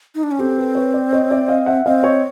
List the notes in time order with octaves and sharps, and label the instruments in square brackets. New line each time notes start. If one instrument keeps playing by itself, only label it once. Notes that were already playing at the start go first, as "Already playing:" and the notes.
[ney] D#4
D4
C#4
[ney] C4 [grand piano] G4 A4
[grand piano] A4 B4
B4 C#5
C5 D5
C#5 D#5
D5 E5
D#5 F5
E5 F#5
[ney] C4 [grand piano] D#5 F5
[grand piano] C#5 D#5